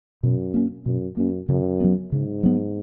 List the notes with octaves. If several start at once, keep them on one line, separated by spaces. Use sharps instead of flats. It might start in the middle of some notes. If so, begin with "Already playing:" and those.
F#2 B2
A#3 C#4
F#2 B2
F#2 A#3 C#4
F#2 C#3
F#3 B3
G#2 C#3
F#3 B3